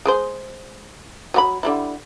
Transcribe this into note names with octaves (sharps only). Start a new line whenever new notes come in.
G#3 G#4 C5
F#3 G4 B5
D3 G3 E4